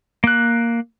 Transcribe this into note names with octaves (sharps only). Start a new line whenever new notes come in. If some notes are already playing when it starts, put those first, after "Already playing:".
A#3 F#6